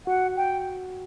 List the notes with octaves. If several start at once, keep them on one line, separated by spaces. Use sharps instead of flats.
F#4 F#5
G5